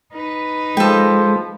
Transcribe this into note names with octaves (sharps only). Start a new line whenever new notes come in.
D#4 B4
F3 G#3 A4 G5